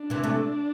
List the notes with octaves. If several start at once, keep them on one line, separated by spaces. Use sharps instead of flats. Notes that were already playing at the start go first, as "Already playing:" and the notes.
Already playing: D4
C3 E3
A3